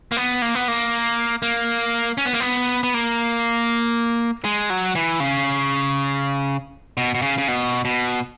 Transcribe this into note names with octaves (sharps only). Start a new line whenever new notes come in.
A#3
B3
A#3
B3
A#3
A#3
C#4
B3
A#3
B3
B3
A#3
G#3
F#3
E3
C#3
B2
B2
C#3
C#3
B2
B2